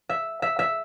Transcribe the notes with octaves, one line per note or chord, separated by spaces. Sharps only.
E5
E5
E5